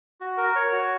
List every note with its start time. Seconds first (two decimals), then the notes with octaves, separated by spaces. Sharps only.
0.21 F#4
0.37 A#4
0.56 C#5
0.72 F#4